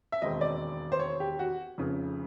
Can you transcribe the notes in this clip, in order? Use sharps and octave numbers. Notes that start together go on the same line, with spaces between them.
E5
E1 D#2 D#3 G#3 C4 D#5
D5
C5
C#5
G4
F#4
F1 F2 C#3